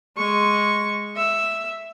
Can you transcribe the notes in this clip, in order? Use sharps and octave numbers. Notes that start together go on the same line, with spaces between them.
G#3 C#6
E5